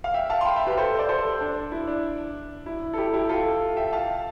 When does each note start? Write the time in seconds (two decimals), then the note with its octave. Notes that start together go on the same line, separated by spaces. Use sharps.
0.04 F5
0.14 E5 G5
0.30 F5 A5
0.41 C6
0.45 G5 B5
0.56 E5 G5
0.67 G4 B4
0.77 A4 C5
0.99 D5
1.09 A4 C5
1.41 D4
1.72 E4
1.87 D4
2.66 E4
2.93 A4
2.98 E4 G4
3.14 E4 G4
3.29 F4 A4
3.77 E5 G5
3.92 F5 A5